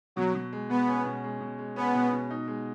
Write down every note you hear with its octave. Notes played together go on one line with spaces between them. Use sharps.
B2 F#3
B2
G#3
B2 B3
C#4
B2
G#3
B2
G#3
B3 C#4
B2
B2
D#4
G#3